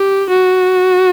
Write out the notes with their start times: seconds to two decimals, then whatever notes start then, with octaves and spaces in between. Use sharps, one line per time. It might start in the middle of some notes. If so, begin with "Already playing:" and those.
Already playing: G4
0.30 F#4